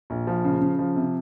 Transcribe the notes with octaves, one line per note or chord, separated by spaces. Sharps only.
A#1
F3
C#3
C#3
F3
C3